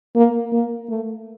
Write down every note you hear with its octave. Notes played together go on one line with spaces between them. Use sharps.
A#3
A#3
A3